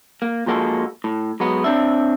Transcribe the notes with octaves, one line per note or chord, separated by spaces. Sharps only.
A#3
A#2 F3 G#3 A#3 F#4 A4
A2
F#3 G#3 B3
C4 D4 E5